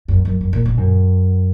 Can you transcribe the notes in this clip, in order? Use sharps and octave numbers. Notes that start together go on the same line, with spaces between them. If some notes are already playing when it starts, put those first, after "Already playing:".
F#2
F#2
F#2
A#2
B2
F#2